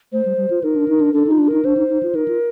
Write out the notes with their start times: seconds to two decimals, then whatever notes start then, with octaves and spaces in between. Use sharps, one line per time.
0.12 A3 C5
0.25 G3
0.37 G3
0.50 F4
0.64 D#4 A#4
0.76 D4
0.88 D#4
1.01 D4
1.14 D4 A4
1.27 D#4
1.31 F4
1.39 D4
1.48 D#4 A#4
1.65 D4 C5
1.77 D#4
1.90 D#4
2.03 F4
2.15 D#4 A#4
2.28 F4